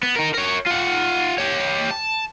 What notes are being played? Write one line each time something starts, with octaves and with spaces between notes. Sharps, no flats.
B3
D#4 A#4
A#4 C#5
F4 F#5
G4 C#5
A5